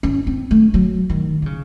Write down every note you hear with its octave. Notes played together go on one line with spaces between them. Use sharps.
C#4
C4
A3
F#3
D#3
D#3
C#3